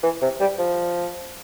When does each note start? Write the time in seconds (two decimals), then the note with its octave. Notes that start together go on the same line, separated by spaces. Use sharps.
0.03 E3
0.22 C3
0.40 G3
0.59 F3